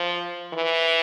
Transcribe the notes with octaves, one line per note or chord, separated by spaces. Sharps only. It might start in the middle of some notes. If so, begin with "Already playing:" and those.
Already playing: F3
E3